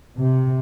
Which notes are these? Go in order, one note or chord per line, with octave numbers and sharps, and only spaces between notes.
C3